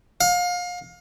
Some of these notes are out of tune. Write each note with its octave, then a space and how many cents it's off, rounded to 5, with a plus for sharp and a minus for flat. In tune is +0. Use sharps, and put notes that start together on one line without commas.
F5 +30